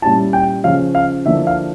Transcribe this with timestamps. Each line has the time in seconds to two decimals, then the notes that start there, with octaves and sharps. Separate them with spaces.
0.02 A#2 G3 C#4 E4 A5
0.33 G5
0.64 C#3 F3 C#4 F5
0.95 F5
1.26 D3 F3 A#3 E4 E5
1.47 F5